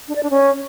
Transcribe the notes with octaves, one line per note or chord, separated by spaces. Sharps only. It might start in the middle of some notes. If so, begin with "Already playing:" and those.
D4
D5
D4
C#4